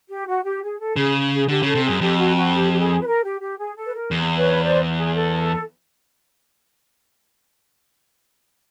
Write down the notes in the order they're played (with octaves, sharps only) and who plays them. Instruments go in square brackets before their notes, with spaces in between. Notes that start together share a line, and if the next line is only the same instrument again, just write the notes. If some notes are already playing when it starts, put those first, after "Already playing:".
[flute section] G4
F#4
G4
G#4
A4
[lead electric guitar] C#3 [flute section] G#4
[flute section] G#4
[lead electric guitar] D3 [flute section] G4
[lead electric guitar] C#3 [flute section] A4
[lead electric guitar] C3
[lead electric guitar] F#2 [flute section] G#4
[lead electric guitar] F2 [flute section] G4
[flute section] F#4
F#4
G4
G4
G#4
B4
A#4
G4
G4
G#4
A4
B4
A#4
[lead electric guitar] E2
[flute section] B4 C#5
C5 D5
G#4
A4